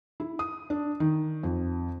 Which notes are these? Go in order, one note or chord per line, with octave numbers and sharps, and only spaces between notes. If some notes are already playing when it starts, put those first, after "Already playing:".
E4
D#6
D4
D#3
F2